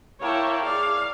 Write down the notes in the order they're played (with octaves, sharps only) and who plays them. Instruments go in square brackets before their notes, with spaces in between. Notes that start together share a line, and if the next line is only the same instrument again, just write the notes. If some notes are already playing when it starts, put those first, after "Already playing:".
[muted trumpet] A#3 [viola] E4 [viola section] C#5 G5 A5
[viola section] G#4 [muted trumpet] D5 [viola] F5